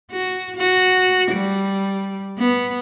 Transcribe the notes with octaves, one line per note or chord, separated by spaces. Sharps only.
F#4
F#4
G3
B3